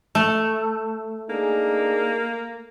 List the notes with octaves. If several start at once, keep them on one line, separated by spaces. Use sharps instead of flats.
A3
A#3 D4 D#4 G#4